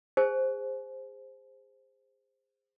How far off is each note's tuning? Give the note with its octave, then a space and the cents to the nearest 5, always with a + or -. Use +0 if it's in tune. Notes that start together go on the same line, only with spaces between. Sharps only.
G#4 -30 C5 +0 G#5 +35